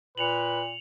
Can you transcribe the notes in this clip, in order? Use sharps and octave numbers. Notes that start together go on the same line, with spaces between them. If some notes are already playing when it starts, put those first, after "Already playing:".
A#2 B4 C#7 F7 F#7